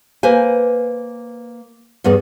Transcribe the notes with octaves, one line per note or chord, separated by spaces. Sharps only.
A#3 B4 C5 G#5
E2 G2 B3 G#4